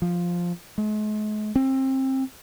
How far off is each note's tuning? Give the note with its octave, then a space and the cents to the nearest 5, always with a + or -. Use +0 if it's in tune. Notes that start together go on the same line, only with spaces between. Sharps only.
F3 +5
G#3 +45
C4 +25